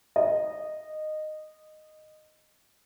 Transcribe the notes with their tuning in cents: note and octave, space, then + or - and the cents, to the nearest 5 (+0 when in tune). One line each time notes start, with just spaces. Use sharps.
D#5 -15